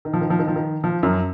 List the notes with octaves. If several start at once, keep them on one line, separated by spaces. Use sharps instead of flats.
D#3
F3
D#3
F3
D#3
F3
D#3
F3
F#2 F#3